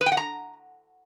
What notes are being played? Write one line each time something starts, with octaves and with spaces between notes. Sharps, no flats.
B4
G5
F#5
A#5